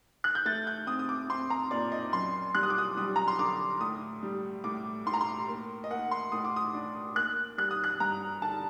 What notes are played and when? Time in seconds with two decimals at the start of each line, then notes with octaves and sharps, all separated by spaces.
0.24 F#6
0.35 G6
0.45 A3 A6
0.67 G6
0.87 C4 D#6
0.99 D#6
1.09 D6
1.30 C4 C6
1.50 A#5
1.71 A#2 D5
1.92 D#5
2.13 F#2 C6
2.55 G3 F#6
2.63 D#6
2.70 D6
2.78 D#6
2.97 G3 D#6
3.16 A#5
3.28 C6
3.39 D3 D6
3.81 A2 D#6
4.23 G3
4.64 A2 D6
5.06 A2 C6
5.14 A#5
5.21 C6
5.48 A#3
5.84 D#5
5.90 A#3 F#5
6.11 C6
6.32 A2 D#6
6.45 D6
6.56 D#6
6.74 D4
7.15 A#3 F#6
7.58 G3 F#6
7.71 D#6
7.84 F#6
8.00 G2 A#5
8.42 D3 A5